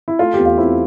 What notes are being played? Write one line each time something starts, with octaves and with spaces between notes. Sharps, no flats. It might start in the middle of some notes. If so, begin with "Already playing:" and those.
E4
A3 F4
E2 G4
F4
C4 E4